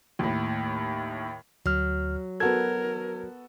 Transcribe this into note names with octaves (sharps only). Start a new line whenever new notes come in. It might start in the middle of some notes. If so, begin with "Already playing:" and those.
D#2 A2
D2 F#3 F6
B3 F#4 A4 A#4 G#6